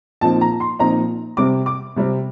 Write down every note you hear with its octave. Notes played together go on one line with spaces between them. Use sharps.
A#2 F3 C4 D#4 A5
A#5
C6
A#2 F3 C4 D#4 A#5
C3 G3 C4 D6
D6
C3 G3 C4